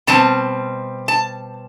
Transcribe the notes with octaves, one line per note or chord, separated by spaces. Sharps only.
B2 G3 C4 A5
A5